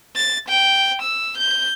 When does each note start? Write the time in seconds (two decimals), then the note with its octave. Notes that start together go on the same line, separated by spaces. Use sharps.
0.16 A6
0.49 G5
1.02 E6
1.38 G6